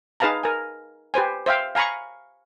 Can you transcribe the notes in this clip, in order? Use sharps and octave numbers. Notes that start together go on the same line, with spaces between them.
D#4 G#4 B4 F5 A5 A#5
A#4 G#5
G4 B4 C5 G#5
C5 E5 F5 G5
F5 G#5 A#5 B5 C#6